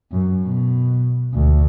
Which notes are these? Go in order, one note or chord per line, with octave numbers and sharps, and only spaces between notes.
F#2
B2
D2